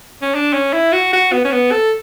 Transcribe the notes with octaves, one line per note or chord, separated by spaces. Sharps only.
C#4
D4
C#4
E4
F#4
F#4
B3
C#4
B3
A4